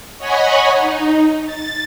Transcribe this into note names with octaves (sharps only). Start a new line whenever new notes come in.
C#5 D#5 F#5 G#5 B5 C#6
D#4
A6